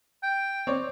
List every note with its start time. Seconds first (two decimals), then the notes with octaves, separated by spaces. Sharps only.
0.23 G5
0.67 C4 C#5 D5